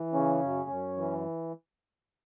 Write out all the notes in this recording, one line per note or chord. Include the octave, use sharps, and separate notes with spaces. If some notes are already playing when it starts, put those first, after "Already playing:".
Already playing: E3
C#3 C#4
F#2
F#2
E3